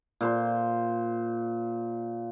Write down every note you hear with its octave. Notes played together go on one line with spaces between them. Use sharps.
A#2 C5 C6